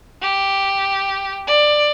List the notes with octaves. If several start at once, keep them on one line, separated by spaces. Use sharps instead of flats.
G4
D5